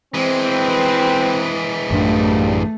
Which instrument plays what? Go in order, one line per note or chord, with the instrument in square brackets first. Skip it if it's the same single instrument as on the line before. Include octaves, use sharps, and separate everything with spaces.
[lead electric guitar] E3 G#3 [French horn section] C4
[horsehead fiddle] B4
[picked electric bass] A1 F#2 D4 [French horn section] A#2 F3 G3 [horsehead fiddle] A3